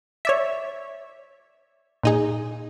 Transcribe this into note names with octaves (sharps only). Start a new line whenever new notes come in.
C#5 D5 E5
A#2 D#4 G#4